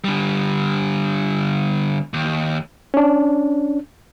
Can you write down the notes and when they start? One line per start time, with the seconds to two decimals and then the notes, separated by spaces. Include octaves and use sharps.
0.04 D3 G3
2.14 D#2
2.94 C#4 D4